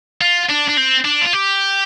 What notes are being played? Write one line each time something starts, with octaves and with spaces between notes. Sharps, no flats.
F4
D4
D4
C4
D4
F4
G4